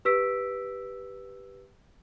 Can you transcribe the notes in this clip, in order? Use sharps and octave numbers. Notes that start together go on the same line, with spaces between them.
G4 B4 E6 B6 D7